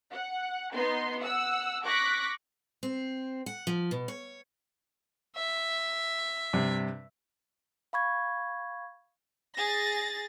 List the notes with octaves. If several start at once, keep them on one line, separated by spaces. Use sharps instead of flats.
F#5
B3 D#4 C6
F#5 E6
C#6 D6 F#6 A#6 B6
C4
F#5
F3
B2
C#5
E5
G2 C3
F5 B5 C#6 G#6
G#4 A6 A#6